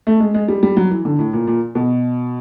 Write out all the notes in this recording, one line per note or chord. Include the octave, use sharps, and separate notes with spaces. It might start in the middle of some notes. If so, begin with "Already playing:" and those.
A3
G#3
G#3
G3
G3
F#3
E3
D3
A2
A#2
A#2
B2